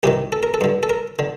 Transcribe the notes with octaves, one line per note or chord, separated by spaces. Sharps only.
C2 C3 D#3 G4
A4
A#4
A4
G2 D3
A4
A#4
D3